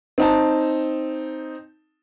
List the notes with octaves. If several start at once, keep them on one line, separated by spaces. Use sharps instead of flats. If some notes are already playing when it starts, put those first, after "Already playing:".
C4 D#4 A5